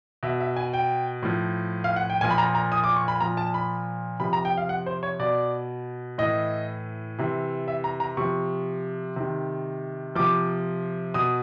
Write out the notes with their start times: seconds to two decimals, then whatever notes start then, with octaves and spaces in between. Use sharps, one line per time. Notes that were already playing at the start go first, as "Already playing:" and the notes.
0.23 B2 E5
0.40 E5
0.56 G#5
0.73 G5
1.23 A2 F3
1.84 F5
1.96 F#5
2.10 G5
2.21 A#2 F3 G#5
2.30 B5
2.38 A#5
2.55 A#5
2.72 D#6
2.84 D6
2.96 C#6
3.08 B5
3.21 A#2 F3 A#5
3.37 A5
3.54 B5
4.20 C3 F3 B5
4.33 A#5
4.45 G5
4.57 F5
4.69 F#5
4.86 C5
5.03 C#5
5.19 B2 D5
6.18 A2 E3 D#5
7.19 C3 E3
7.68 E5
7.84 A#5
8.00 A#5
8.17 C3 F3 C#6
9.16 C3 D#3
10.15 C3 F3 D6
11.14 B2 D#6